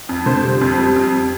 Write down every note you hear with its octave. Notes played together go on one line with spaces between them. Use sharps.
F2
D3 C5
G3
F2
G3
F2